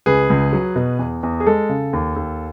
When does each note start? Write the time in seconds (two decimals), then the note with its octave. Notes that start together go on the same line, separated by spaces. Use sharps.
0.06 C#2 G#4 B4
0.30 C#2
0.53 F#3
0.76 B2
0.99 E2
1.23 E2
1.40 G#4
1.47 G#3 A4
1.69 C#3
1.93 D#2
2.16 D#2